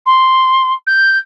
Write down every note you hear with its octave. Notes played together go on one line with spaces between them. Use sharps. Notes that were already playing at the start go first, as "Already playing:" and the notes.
C6
G6